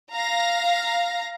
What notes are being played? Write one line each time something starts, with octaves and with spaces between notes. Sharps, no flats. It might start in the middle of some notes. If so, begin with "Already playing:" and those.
F5 A#5 A#6